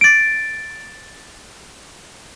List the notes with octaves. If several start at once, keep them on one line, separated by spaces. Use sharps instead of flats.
A6 D7